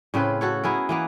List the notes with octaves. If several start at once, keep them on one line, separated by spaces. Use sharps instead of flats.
A2 C#3 C4 B4
F#4 A4 C#5
B3 E4 G#4 A#4
E3 A#3 B3